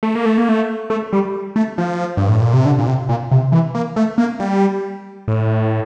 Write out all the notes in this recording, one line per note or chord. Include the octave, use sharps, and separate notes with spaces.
A3
A#3
A3
A#3
A3
A3
G3
A3
F3
G2
A2
A#2
C3
D3
A#2
C3
A#2
C3
E3
A#3
A3
A#3
G3
A2